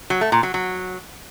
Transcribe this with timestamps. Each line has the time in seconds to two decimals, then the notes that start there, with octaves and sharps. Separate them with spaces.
0.10 F#3
0.21 A3
0.32 A#2
0.43 F#3
0.54 F#3